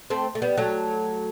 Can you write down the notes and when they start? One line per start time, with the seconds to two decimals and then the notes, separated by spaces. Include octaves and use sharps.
0.10 A3 C4
0.35 A3
0.42 G3 B3
0.57 F#3 A3